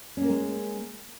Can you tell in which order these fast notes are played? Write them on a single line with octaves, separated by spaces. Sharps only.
C#4 A#3 A#4 G#3